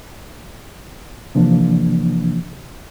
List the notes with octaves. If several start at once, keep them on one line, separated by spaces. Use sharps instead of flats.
C3 E3 F3 A#3 D4